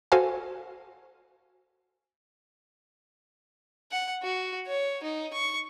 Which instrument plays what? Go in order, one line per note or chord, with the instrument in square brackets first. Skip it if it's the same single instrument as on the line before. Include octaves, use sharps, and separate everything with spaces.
[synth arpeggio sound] F#4 A4 C5 F5 G#5
[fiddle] F#5
F#4
C#5
D#4
C#6